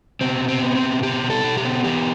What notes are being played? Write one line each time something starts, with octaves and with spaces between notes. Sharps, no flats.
B2 C4
B2
C4
B3
C4
B2
B3 G4
B2
A4
B2
G4
B3
E3 G4